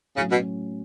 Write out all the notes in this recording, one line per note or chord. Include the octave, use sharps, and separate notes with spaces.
A2 C#3 F#3 C#4 F#4
B2